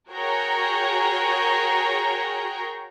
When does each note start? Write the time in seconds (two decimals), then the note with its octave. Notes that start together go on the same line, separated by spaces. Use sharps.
0.10 F#4 G#4 A#4 C#5 G5 A#5